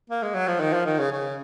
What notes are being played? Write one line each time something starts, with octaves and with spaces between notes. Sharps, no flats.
A#3
G#3
F#3
F3
D#3
F3
D#3
C#3
C#3